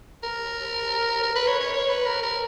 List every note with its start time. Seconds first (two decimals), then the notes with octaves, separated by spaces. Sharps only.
0.23 A#4
1.23 A#4
1.35 B4
1.48 C#5
1.60 C#5
1.73 C#5
1.89 B4
2.06 A#4
2.23 A#4